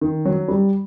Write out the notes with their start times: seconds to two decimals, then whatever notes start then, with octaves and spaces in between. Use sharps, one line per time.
0.01 D#3
0.25 F#3
0.48 G3